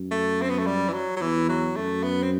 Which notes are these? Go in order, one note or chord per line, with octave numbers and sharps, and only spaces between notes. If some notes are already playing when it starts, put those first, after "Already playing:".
Already playing: F#2
A3
C4
B3
A3
G3
E3
F#3
F#3
E2 E3
F#3
F#2 A3
B3
C4